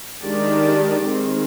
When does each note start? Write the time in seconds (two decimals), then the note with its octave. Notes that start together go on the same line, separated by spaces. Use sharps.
0.24 D#3 G#3 D4 G4 D5
1.04 D#3 G#3 C4